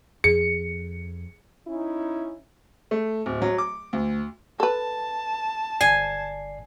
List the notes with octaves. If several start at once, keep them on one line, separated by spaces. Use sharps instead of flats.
F2 G#4 C#7
C#4 D#4 E4
A3
D1
F#3
D6
D2
A4 B4 A5
G1 D5 G#5 C7